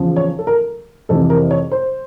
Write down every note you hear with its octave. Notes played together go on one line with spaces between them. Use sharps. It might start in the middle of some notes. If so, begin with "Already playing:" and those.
Already playing: E2 C#3 F3
C#5
A4
A#4
F2 C3 E3 A4
A#4
C#5
C5